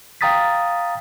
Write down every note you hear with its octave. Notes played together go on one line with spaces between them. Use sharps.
F5 G5 A#5 D#6 A6 B6